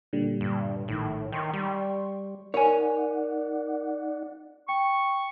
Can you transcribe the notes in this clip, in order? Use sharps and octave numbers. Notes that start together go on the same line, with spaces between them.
A#2 D3 G3
G2
A#1 A2 D#3
D#3 G5 C6 C#6
G3
D#4 A#4 C#5 D5 F#5 G#5
G5 C#6